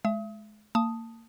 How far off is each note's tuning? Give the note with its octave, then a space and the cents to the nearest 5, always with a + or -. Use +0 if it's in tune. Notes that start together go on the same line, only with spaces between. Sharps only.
G#3 +30 E5 +35 D#6 +35
A#3 -30 A5 +0 D#6 +0